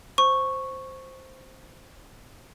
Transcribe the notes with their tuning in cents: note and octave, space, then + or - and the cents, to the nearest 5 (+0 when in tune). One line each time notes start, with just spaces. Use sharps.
C5 +0 C#6 -5